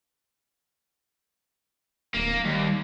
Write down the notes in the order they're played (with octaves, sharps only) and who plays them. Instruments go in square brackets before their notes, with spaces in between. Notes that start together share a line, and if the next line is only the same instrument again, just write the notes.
[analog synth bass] D1 [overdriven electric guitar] A#3
[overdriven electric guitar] D#2 [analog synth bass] G3